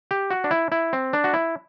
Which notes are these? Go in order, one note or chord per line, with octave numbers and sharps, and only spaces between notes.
G4
F#4
D4
E4
E4
C4
D4
F#4
E4